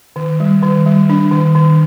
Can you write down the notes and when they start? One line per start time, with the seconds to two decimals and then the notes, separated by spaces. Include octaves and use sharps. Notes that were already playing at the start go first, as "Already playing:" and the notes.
0.16 D#3
0.40 G3
0.62 D#3
0.86 G3
1.09 D4
1.32 D#3
1.55 D#3